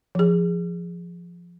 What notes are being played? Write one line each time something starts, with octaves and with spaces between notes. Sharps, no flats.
F3 G#4